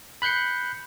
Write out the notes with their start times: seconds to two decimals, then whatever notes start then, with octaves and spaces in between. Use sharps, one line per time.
0.22 B5 F#6 G6 C7 C#7